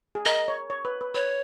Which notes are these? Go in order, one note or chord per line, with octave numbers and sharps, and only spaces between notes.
G#4
A#4 D#5
C#5
C#5
B4
B4
B4 C#5